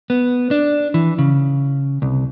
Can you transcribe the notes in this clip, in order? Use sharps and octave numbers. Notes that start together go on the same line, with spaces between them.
B3
D4
E3
C#3
C2